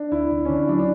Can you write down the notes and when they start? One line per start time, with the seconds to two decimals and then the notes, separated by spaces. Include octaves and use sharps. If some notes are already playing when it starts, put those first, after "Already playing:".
Already playing: D4
0.12 D2 E4
0.31 D2
0.45 C#4
0.49 D3 D4
0.63 E4
0.69 F#3 D4
0.79 D4